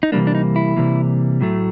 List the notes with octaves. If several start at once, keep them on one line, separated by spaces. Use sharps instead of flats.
D#4
C3 E3 G3 A#3 D4
D4
D#4
E4
C3 E3 G3 A#3
A2 F#3 A3